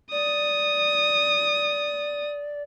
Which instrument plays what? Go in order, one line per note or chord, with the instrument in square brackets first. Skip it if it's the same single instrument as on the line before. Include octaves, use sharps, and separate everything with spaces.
[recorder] D5 [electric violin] D#6